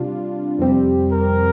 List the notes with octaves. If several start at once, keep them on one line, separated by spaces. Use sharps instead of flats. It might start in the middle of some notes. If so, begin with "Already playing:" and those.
Already playing: C3 G3 D4 F4
F2 C3 G3 C4 G4
A#4